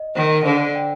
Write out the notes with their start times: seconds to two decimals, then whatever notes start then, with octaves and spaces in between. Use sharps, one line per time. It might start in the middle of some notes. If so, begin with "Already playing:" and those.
Already playing: D#5
0.15 D#3 C5
0.45 D3 C5
0.75 G5